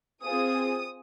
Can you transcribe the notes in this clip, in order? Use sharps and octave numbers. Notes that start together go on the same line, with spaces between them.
C4 F4 G#4 D#6